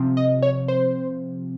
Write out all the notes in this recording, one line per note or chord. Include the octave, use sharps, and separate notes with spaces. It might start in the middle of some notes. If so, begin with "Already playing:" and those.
Already playing: C3 F3 C4
D#5
C#5
C5